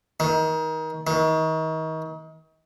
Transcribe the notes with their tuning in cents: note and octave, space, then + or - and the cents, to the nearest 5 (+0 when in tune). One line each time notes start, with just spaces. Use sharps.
D#3 +25
D#3 +35